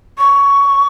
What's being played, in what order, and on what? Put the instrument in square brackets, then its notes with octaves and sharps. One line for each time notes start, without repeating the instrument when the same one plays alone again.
[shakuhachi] C#6